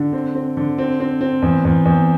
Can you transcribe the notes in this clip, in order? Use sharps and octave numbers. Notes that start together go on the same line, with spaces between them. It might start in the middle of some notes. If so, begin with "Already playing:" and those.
Already playing: D3
C4
C4
D3
C4
C4
C4
E2
E2
E2